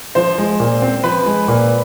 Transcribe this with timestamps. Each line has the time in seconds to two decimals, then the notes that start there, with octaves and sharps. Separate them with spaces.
0.15 F3 C5
0.38 G#3
0.60 A#2
0.82 C4
1.04 F3 B4
1.26 G#3
1.48 A#2